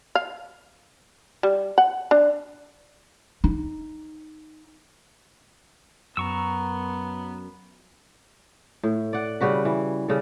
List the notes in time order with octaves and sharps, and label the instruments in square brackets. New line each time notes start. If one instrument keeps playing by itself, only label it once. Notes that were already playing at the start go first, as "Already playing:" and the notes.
[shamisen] F5
G3
F#5
D4
[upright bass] D#4
[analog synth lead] F#2 [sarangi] B3 [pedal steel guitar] A#5 C#6 E6
[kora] A2
D5 F#5
C#3 G3 F#4 B4
E3
C#3 G3 A4